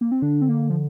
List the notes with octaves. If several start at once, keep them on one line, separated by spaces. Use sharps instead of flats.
A#3
C4
D3 D4
C4
A#3
F3